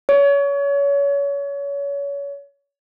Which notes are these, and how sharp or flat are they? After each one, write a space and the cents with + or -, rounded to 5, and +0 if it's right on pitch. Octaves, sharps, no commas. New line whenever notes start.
C#5 +30